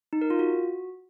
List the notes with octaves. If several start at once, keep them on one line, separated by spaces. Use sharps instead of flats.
D#4
A#4
F4
F#4